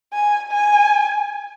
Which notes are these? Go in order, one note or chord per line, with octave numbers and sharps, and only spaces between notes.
G#5
G#5